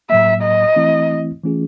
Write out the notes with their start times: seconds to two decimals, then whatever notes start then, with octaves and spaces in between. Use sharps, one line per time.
0.09 A2 F#3 A#3 E5
0.43 D#5
0.76 E3 A3 C4 E4
1.44 E3 A3 C#4 F4 G#4